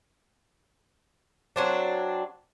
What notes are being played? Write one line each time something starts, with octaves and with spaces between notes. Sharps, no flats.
F#3 C4 D4